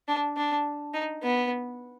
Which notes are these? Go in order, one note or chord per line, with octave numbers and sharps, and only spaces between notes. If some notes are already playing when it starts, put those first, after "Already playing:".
D4
D4
D#4
B3